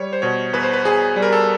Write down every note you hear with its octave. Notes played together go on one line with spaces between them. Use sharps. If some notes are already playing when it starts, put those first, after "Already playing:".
Already playing: G3 C#5
C5
B2 C#5
E2 B4
C5
B4
E2 G#4
G3
A#4
A4